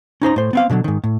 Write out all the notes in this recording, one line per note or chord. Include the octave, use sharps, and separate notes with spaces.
C#4 D#4 C5 A#5
A2 C5
B3 C4 F5
B2 D3 E3 F#3
G#2 D#3
A2